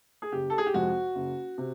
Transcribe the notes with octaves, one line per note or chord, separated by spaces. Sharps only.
G#4
F#1 G4
A4
G#4
G4
F2 C3 F3 G#3 F#4
F#1
C3